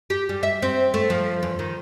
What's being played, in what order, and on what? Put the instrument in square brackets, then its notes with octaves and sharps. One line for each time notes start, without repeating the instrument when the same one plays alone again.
[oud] G4
G3
E5
C4
A3
F3
E2
D#3